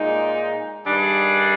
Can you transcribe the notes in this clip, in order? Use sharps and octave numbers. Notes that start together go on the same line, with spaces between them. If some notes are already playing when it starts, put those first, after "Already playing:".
Already playing: A#2 G#3 D#4
G2 D#3 G3 D4 G#4